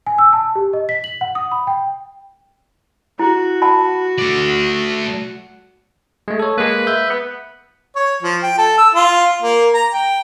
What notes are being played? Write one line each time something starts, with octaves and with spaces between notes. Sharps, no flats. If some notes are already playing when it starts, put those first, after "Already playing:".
G#5
E6
A5
G4
D#5
B6
F#7
F#5
D#6
B5
G5
E4 F#4
F#5 A5 B5
A3 D5
G#3 A3
A4 C#5
G#3 A#3 B4
E5 G6
B3
C#5
F3
G5
A4
E6
F4
A#3
A#5
G5